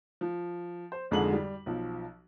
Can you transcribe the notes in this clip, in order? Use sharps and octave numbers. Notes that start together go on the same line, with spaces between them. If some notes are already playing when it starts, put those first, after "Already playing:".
F3
C5
G#1 F2 G#2 D3 G#4 F#7
G3
B1 F3